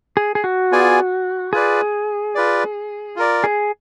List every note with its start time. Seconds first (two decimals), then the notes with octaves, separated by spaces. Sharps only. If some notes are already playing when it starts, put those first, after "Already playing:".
0.17 G#4
0.35 G#4
0.44 F#4
0.72 B3 F4 G#4 D5 G#5
1.53 F4 G#4 B4 D5
2.35 F4 B4 D5
3.16 F4 A#4 D5
3.44 G#4